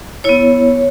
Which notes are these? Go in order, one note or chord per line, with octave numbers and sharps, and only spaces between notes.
B3 E4 C#5